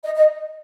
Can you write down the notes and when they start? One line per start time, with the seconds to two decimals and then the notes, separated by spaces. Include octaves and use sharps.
0.04 D#5
0.16 D#5